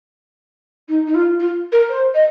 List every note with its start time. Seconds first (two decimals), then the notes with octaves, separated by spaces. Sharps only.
0.88 D#4
1.07 D#4
1.14 F4
1.39 F4
1.72 A#4
1.89 C5
2.14 D#5